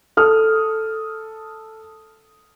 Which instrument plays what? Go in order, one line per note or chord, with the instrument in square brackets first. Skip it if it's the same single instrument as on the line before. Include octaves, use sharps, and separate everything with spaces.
[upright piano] A4 D#6 F6